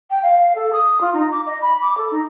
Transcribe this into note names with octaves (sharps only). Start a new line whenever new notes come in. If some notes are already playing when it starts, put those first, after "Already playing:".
G5
F5
A4
D#6
F4
D#4
D6
D#5
B5
D6
A4
D#4